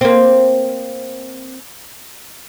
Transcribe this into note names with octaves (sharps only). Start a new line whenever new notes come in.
A#3 C4